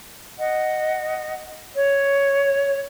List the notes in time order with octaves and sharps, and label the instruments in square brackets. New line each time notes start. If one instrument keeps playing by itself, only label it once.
[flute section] D#5 F#5
C#5